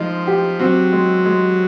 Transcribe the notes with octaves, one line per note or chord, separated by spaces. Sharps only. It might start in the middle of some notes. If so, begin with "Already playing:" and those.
Already playing: F3 G#3 D#4
G4
F#3 C4
G#3
G#3